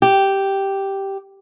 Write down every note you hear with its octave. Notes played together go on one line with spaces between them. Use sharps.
G4